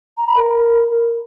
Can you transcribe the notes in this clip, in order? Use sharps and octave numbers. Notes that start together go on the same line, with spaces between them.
A#5
B5
A#4